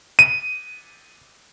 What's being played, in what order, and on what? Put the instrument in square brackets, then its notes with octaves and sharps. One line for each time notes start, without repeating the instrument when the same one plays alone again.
[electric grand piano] D#7